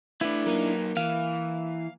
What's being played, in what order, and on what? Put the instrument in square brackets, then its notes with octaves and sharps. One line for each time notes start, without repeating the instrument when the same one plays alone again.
[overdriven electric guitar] A3 B4 [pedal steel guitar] D4 E4
[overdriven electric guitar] F#3 D#4 [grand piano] A#3
[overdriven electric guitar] E3 [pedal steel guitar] F5